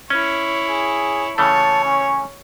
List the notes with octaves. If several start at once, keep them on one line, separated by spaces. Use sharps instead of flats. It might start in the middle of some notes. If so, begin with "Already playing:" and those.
C#4 E4 C#5
G#4
C#3 E3 A3 C#5 A5
C#4